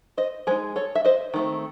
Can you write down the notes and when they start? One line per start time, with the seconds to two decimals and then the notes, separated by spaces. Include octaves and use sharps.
0.17 C5 D#5
0.47 G#3 D#4 G#4 C5
0.76 A4 C#5
0.95 E5
1.04 C5 D#5
1.34 D#3 A3 C4